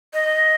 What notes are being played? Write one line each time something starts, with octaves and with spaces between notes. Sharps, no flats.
D#5